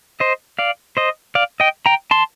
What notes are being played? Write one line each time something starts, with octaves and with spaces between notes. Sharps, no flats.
C5 D#5
D5 F5
C5 D#5
D5 F5
D#5 G5
G5 A#5
A5 C6